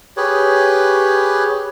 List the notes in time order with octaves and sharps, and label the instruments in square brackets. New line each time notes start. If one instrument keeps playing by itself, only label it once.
[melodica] G4 G#4 B4 C#5